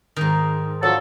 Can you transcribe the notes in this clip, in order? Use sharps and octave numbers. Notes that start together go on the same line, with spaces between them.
G#2 D#3
F3 F#3 D4 A4